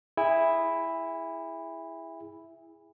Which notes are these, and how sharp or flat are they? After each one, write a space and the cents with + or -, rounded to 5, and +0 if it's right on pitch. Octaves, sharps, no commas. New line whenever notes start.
E4 +0 G#4 -10 G#5 -40